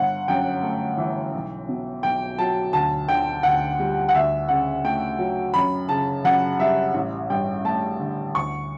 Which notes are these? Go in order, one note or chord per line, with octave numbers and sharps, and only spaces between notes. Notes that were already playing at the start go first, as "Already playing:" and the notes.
Already playing: G1 F#5
F#2 G5
A3
E3
B1
B2
B1 G5
F#3 A5
D2 A5
D3 G5
D2 F#5
G3
F#5
D2 E5
C#3 F#5
A3 G5
F#3
F#2 B5
C#3 A5
F#2 F#5
G3 E5
A1
G2 G5
A3 A5
D3
D2 C#6